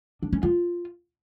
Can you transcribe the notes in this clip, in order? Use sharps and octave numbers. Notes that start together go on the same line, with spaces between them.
D4
C#4
F4